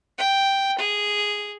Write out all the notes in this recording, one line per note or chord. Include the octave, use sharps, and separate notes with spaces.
G5
G#4